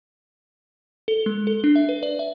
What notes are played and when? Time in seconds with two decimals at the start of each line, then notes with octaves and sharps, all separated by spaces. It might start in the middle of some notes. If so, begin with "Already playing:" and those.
1.08 A4
1.26 G#3
1.47 A4
1.64 D4
1.76 E5
1.89 B4
2.03 D5
2.19 E5